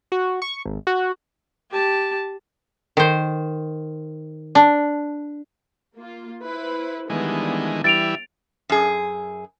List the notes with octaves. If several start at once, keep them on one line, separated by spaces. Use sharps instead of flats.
F#4
C#6
G#1
F#4
G4 A5
D#3 C5
D4
A#3 F4
E4 B4 C5
D#3 E3 G3 G#3 B3 D4
E3 G3 E4 A6 D7 F7
F#2 G#4